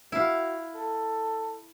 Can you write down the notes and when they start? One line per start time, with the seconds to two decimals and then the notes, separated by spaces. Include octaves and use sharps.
0.12 E4 F#4 F5
0.75 A4